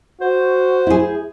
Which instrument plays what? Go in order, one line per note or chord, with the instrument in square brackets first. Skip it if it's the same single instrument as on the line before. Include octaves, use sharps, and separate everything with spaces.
[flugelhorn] F#4 [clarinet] C5
[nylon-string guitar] E4 G#4